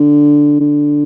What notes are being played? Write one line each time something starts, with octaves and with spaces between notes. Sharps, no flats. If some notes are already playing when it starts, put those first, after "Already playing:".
Already playing: D3
D3